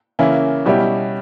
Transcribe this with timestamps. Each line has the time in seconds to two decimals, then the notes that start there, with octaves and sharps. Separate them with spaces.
0.19 C#3 E3 A#3 C#4 E4
0.66 B2 G3 C#4 E4 G4